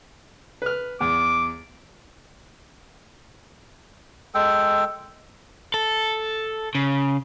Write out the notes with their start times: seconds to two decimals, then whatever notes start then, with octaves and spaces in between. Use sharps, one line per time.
0.62 B4 F6
1.01 E2 D6
4.35 G#3 A4 G5
5.74 A4
6.75 C#3